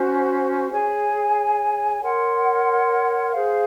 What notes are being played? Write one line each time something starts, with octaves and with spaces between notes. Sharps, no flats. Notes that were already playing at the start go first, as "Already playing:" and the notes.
Already playing: C#4 F#4 C5
G#4 C#5 G#5
A#4 C#5 F#5 C6
G#4 C5 F5